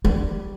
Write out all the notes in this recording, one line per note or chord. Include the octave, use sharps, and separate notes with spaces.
G3